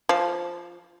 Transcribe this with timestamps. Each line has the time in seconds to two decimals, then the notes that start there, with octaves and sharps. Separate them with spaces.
0.09 F3